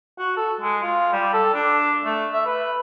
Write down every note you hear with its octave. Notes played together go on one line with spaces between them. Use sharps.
F#4
A4
G#3
F4
G3
A4
D4
A3
E5
B4